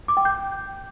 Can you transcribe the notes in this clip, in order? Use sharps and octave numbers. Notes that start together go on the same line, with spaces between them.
D6
G5
G6